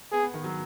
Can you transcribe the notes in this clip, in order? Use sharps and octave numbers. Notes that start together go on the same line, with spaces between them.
B3 G#4
B3
D#3
F#3